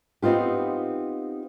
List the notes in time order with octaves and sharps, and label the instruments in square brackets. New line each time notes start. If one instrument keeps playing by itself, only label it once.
[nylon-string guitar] B3 C4 D#4 F4 G4